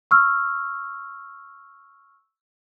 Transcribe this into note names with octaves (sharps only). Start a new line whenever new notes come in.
C#6 E6 F6